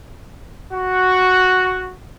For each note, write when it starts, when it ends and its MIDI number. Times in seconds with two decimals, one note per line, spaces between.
0.73 1.90 66